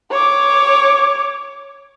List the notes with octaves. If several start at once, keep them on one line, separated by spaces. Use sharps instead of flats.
C#5 D6